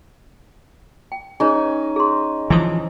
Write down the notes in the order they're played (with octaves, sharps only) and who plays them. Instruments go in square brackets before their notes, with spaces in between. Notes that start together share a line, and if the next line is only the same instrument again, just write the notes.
[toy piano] G5
[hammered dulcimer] C#4 D#4 [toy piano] G#4 B4 C#5
[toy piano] G#4 C6
[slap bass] E3 F3 [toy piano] E4 C5 D#6